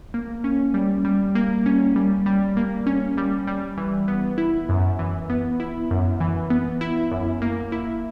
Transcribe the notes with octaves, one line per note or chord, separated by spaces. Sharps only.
A#3
C#4
G3
G3
A#3
C#4
G3
G3
A#3
C#4
G3
G3
E3
B3
E4
F#2
E3
B3
E4
F#2
E3
B3
E4
F#2
A#3
E4